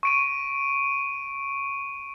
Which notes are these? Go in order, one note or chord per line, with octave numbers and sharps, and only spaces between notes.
C#6 D7 D#7